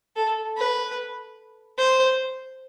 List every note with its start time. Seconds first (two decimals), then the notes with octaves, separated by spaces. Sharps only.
0.16 A4
0.57 B4
1.78 C5